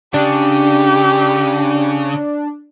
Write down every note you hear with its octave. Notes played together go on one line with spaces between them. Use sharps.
C#3 D4 G4